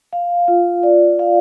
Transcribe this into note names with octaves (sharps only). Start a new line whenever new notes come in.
F5
F4
D5
F5